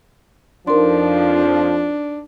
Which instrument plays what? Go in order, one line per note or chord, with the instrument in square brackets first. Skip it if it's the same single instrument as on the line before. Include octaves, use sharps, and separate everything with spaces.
[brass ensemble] F2 F3 [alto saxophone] D4 [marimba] D#4 A#4 C6